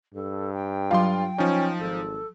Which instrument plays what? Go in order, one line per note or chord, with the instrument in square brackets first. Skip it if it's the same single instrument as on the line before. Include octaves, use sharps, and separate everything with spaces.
[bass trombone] G2 [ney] A4
[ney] G5
[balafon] F#3 F5 [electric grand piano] F4 C6
[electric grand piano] F3 D#4 [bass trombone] C#4
[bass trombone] G#1 [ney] A4